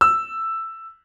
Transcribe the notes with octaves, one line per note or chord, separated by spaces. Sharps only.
E6